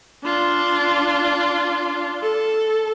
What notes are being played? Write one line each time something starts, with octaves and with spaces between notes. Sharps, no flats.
D4 F4
A4